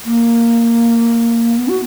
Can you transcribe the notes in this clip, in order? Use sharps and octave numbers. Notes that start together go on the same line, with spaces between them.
A#3
B3
F#4